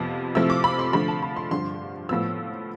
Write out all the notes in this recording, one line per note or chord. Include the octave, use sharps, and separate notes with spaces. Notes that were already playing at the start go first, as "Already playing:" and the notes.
Already playing: F2 C3 F3 B3
C3 F3 A3 C4 E4 E6
D6
B5
C6
D3 F3 A3 B5
A5
B5
C6
G2 D3 F3 C6
A2 F3 B3 F4 E6